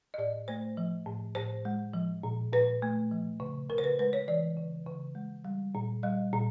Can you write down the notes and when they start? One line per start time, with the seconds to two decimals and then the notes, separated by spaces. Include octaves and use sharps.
0.14 D#5
0.18 A2 D5
0.48 A3 C5
0.77 F3
1.07 A2
1.35 A2 C5
1.65 G#3
1.94 F3
2.23 A#2
2.53 A#2 B4
2.82 A3
3.11 F3
3.40 C#3
3.70 C#3 A#4
3.78 C5
3.84 B4
3.99 G#3 B4
4.13 C#5
4.28 E3 D5
4.57 C#3
4.87 C#3
5.15 G#3
5.45 G3
5.75 A#2
6.03 G3 D#5
6.33 A#2